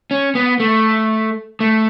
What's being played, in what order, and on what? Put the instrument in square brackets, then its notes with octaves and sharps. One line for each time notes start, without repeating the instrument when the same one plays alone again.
[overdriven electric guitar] C#4
B3
A3
A3